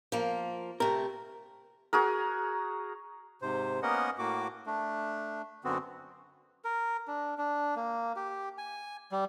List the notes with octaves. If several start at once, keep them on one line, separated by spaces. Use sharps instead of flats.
F3 A#3
C3 A3 A#4
F#4 G#4 A#4
G#2 C3 C5
A#3 B3 C#4 A#4 D#5 F#5
A2 A#3 F#4 D6
A3 D4
F#2 D3 B3 C4 F#4
A#4
D4
D4
A#3
G4
G#5
G3